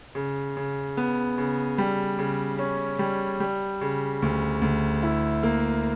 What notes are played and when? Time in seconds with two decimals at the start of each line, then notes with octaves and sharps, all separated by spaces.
0.15 C#3
0.57 C#3
0.97 B3
1.38 C#3
1.78 G3
2.19 C#3
2.58 C#4
2.99 G3
3.40 G3
3.81 C#3
4.22 D2
4.62 D2
5.03 E4
5.43 A#3